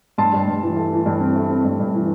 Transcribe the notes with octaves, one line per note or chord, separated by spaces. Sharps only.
G2 A5 C6
G2
G2
E3
A3
E3
G2
C4
A3
C4
G2
G2
E3